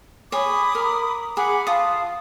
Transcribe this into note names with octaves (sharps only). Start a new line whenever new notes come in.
G#4 C#5 B5 D6 D#6
A#4
G#4 F#5 B5 D6
F4 F5 A5 D#6